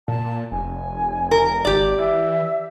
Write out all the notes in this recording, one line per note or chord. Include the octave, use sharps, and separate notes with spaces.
A#2 A5
F1 G#5
A#4
G#1 G4 D5
E3 E5